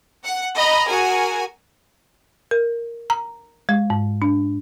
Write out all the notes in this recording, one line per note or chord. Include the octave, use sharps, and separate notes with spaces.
F#5
D#5 A#5 B5
F#4 G#4 A#4 G#5
A#4
A#5
G#3
G#2
D4